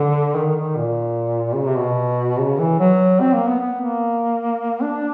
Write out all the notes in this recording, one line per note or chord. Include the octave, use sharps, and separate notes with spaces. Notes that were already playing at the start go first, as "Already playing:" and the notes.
Already playing: D3
D#3
D#3
A#2
C#3
C3
B2
C#3
E3
F#3
C4
A#3
B3
B3
A#3
D4